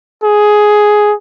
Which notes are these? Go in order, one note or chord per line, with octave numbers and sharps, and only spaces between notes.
G#4